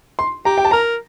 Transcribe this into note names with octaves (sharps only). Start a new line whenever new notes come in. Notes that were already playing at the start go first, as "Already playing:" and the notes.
C6
G4 A#5
G5
A5
A#4 A#5